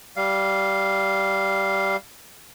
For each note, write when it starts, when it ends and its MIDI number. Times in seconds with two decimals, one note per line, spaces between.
0.17 1.96 55
0.17 1.96 77